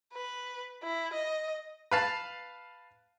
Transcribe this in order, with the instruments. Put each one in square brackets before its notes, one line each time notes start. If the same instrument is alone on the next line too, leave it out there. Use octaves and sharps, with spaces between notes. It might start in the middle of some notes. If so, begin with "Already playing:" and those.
[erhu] B4
E4
D#5
[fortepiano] B4 F5 A5